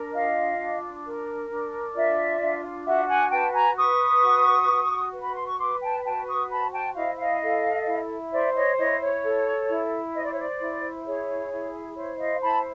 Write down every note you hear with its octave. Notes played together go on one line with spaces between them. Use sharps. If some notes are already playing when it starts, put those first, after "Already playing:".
Already playing: D4 A#4
F4 D#5 F5
D4
A#4
D4
F4 D5 E5
D4
F#4 E5 F#5
F#5 G#5
B4 G5 A5
G#5 A#5
B4 C#6 D#6
F#4
F#4
B4
B5
C6
C#6
B4 C6 D6
G5 A5
F#4 G5 A5
C#6 D#6
C5 A5 B5
G5 A5
E4 D#5 F5
D#5 F5
A4
E4
C5 D5 E5
C#5 D#5
E4 C#5 D#5
C#5
A4
E4
C5 D#5
D5
C#5
D5
E4
G#4 C#5
E4
C5 C#5
D#5 F5
E4 A5 B5